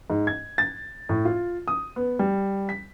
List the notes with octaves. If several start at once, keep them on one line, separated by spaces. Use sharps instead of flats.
G#2
G#6
A6
A2
F4
D#6
B3
G3
B6